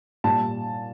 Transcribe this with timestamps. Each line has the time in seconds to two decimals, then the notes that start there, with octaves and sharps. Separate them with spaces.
0.24 A#2 G3 A5